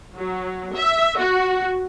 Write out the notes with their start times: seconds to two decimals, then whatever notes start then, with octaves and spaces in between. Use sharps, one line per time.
0.16 F#3
0.75 E5
1.18 F#4